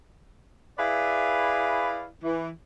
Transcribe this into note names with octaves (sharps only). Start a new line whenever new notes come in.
E4 G#4 B4 D5 E5 F5
E3